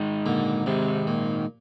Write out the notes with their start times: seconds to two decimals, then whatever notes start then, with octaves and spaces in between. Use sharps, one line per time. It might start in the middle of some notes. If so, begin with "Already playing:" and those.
Already playing: G#2 D#3 G#3 D#4
0.26 A#2 D3
0.66 G#2 C3 D#3 G#3 D#4
1.07 A#2